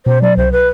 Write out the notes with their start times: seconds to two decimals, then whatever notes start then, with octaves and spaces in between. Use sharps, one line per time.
0.06 B2 C5
0.22 F#3 D5
0.37 C2 C5
0.52 B4